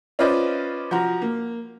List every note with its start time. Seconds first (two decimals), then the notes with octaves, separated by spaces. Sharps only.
0.19 C#4 F4 B4 C5 D5 D#5
0.91 F3 F#4 A#5
1.22 A#3